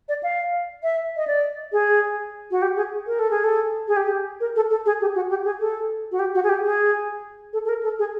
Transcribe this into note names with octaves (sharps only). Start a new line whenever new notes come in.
D5
F5
E5
D#5
D5
G#4
F#4
G4
G#4
A#4
A4
G#4
A4
G#4
G4
A#4
A4
A4
G#4
G4
F#4
G4
G#4
A4
F#4
G4
F#4
G#4
G4
G#4
A4
A4
A#4
A4
G#4